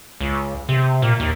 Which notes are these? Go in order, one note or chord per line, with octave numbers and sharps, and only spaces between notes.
C#2
C3
A#2
D#2